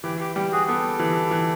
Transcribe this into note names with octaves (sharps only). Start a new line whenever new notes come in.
E3 G4
G4
G3 G4
F#4 G#4
B3 G4 A4
E3
E3